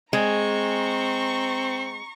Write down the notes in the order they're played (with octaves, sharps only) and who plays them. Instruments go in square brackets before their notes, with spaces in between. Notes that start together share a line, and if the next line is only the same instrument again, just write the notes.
[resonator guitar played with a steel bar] G#3 [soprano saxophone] C4 [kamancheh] A#5 C#6